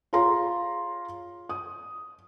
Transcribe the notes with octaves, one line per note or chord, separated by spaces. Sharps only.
F4 G#4 C#5 F5 A#5 C6
D#6